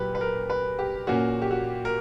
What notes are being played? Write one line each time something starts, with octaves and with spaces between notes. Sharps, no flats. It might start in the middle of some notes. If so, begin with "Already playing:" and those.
Already playing: A#2 F#3 G4 B4
B4
A#4
B4
G4
A#2 A#3 C#4 F#4
G4
F#4
A#4